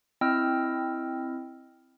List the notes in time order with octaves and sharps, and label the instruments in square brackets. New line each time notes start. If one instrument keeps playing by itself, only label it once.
[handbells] C4 E4 D#5 G5 E6 F6